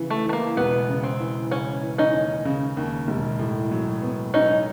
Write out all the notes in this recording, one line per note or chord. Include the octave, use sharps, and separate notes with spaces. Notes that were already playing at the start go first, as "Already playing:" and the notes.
Already playing: C#3 E3
A3
E3 A3
A#3
E1 B3
C#3
C4
E3
C#3 C#4
E3
C#4 D#4
D#2
C#3
D#2
E1
A2
F#3
B3
F#3 C#4 D#4